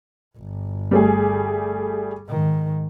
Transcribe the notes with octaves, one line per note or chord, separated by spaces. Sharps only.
G1
G3 A3 G#4
G#2 D#3